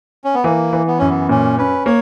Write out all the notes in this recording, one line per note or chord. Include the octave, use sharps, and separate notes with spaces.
C#4
B3
E3 A#3
E3
B3
F#2 C#4
B3
A#2 C#4
C#4 B4
A#3 C#5